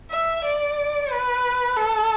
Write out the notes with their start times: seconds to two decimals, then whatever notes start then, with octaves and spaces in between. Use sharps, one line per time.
0.11 E5
0.44 D5
1.11 B4
1.77 A4